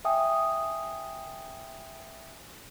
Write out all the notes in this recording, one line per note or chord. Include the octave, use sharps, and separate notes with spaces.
E5 G5 G#5 D#6